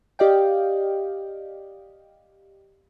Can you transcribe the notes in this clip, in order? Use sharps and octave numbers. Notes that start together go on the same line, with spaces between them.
G4 D5 D#5 F5 G5